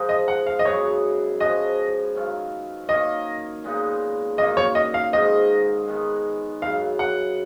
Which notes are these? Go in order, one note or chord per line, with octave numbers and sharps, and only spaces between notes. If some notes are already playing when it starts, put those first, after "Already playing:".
Already playing: F3 G#3 D#4
D#5
F#5
F5
D#5
F#2 C#3 F#3 B3 C#5
F3 G#3 C#4 F#4 D#5
D#3 F#3 C#4 F4
D#3 A#3 C#4 D#5
A#2 G#3 B3 D#4
F#2 D#3 A#3 F4 D#5
C#5
D#5
F5
G#2 D#3 G#3 D#4 D#5
D#3 G#3 B3
F#2 C#3 F#3 F5
F#5